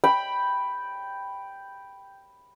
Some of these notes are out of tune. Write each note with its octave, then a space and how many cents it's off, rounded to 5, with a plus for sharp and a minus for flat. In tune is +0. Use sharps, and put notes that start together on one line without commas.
G5 +0 B5 +0